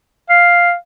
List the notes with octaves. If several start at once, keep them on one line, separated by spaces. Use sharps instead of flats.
F5